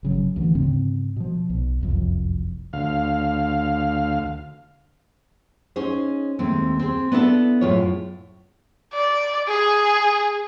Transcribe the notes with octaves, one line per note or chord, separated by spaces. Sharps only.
G1 C#3 F#3
D2 E3
G#2 C#3 C4
B2 F3
B1
F#1 C2 F2
D2 F5
C#4 D#4 G#4 C5
D#2 G#3 A3 C4
C4 G#4
B3 D4 E4 F#4 A4
F#2 A2 F4 G#4 C#5
D5
G#4